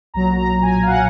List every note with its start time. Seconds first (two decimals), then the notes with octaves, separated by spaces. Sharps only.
0.14 B1 A#2 F#3 A#5
0.38 A#5
0.62 G#5
0.83 F5
0.87 F#5